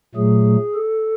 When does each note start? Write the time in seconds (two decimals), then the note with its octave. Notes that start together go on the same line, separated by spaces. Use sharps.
0.15 A#2 F#3 A3 G#4
0.74 A4